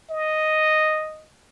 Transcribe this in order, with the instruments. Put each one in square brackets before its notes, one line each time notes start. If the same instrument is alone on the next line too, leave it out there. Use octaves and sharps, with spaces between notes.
[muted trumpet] D#5